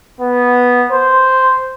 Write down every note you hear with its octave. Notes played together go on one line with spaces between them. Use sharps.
B3
C5